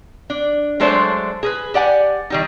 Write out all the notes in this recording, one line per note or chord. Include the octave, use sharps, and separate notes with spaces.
D4
F#3 G#3 A3 D4 C5
G#4 A#4 B4
G4 D5 F#5 G#5
D#3 G3 D#4